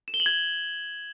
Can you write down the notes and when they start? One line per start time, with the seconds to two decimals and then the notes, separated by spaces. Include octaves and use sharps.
0.08 E7
0.14 G7
0.20 F#7
0.26 G#6